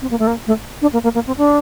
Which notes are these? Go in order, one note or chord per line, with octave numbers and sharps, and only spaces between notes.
C4
A#3
A3
A#3
A3
D4
A#3
A#3
A#3
C4
D4